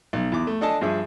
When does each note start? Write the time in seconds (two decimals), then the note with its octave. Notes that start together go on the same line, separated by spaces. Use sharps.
0.13 B1
0.32 E2 D6
0.47 A3
0.61 D4 A4 D#5 G#5 A5
0.81 G2 F3 G#4 E5